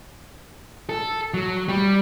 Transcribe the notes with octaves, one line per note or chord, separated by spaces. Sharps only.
A4
F#3
G3